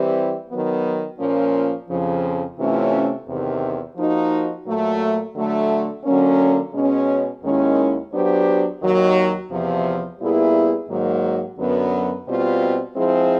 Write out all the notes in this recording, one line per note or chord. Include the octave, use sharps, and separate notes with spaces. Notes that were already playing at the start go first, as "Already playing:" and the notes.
Already playing: E3 G3 C4 E4 G4
D#3 F#3 B3
A#2 F3 A#3 C#4
F2 C#3 F3
C3 E3 A3 C#4 F4
E2 C3 D#3
F3 A#3 D#4 F#4
A#2 F#3 A3
D3 F#3 A3
D3 F#3 A#3 C#4
B2 G#3 C#4
D#2 D#3 G#3 C#4 E4
F#3 B3 D4 G4 C5
D#2 D#3 F#3
E2 C3 F3
A#2 G3 B3 E4 G#4
G#2 D#3 F#3 A#3
F#2 D3 F#3 B3
B2 G3 C4 F4
F3 G#3 C4 E4 G#4